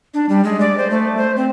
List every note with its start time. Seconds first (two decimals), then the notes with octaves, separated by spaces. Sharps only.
0.14 D4
0.29 G3
0.44 G#3
0.60 D5
0.77 C5
0.91 A3
1.17 C5
1.37 C4